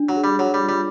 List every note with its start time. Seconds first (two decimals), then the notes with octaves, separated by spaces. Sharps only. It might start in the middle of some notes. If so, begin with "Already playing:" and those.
Already playing: D4
0.09 F#3
0.17 G#4
0.24 G3
0.39 F#3 C#5
0.54 G3
0.62 F4
0.69 G3